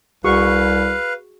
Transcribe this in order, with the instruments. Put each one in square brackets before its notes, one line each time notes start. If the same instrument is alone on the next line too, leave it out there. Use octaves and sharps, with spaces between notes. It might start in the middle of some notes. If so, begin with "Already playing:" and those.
[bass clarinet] C2 [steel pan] F#4 G#4 C#6 [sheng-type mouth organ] B4 F5